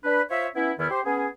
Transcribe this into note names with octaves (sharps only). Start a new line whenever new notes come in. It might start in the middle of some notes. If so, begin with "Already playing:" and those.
D4 B4
F4 C5 C#5 E5
B3 C#4 E4
E2 D#3 B3 E4 F6
G4 C5
B3 C#4 G#4